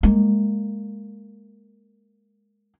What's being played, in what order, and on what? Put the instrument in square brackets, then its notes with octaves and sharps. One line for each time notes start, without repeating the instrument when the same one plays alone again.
[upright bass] G#3 A#3